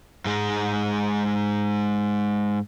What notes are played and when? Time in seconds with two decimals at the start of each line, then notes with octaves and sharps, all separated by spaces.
0.25 G#2 G#3